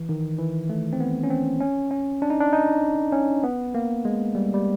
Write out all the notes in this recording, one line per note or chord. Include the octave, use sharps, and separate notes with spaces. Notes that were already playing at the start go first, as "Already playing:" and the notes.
Already playing: E3
D#3
E3
A3
C4
B3
C#4
C4
C#4
C#4
D4
D#4
D4
D#4
C#4
B3
A#3
G#3
G3
G3